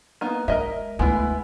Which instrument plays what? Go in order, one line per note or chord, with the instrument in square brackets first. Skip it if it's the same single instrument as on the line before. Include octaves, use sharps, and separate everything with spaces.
[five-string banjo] A#3 B3 D#4
[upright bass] G#3 [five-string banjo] A#4 D#5 E5
[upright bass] D2 [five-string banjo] G#3 B3 E4